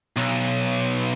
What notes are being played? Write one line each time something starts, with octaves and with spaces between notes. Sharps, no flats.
B1